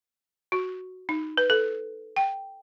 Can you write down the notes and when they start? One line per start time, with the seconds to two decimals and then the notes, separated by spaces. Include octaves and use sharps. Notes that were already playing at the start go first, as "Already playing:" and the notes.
0.52 F#4
1.09 D#4
1.37 B4
1.50 A4
2.16 G5